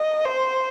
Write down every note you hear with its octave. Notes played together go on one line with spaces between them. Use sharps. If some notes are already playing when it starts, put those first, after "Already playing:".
Already playing: D#5
C5